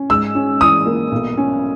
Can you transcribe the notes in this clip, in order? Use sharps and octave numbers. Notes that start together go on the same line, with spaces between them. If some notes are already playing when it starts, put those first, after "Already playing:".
Already playing: C#4
G#2 E6
C#4
E3 D#6
A#3
B1
C#4